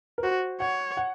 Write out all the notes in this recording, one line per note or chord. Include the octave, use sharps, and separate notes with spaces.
A#4
F#4 C5
C#5 F#5
F#5